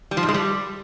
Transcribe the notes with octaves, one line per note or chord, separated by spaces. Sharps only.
G3
F3
G#2
G#3
G3